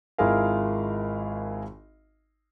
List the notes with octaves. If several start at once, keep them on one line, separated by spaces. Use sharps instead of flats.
G#1 E4 F4 G#4 A#4 F5